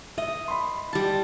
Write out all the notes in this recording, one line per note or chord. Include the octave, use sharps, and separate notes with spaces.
D#5 E5
B5 C6
G3 A5